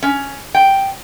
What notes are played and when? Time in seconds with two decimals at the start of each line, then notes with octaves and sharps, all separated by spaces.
0.03 C#4
0.55 G5